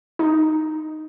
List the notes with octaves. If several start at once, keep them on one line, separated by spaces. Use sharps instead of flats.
D#4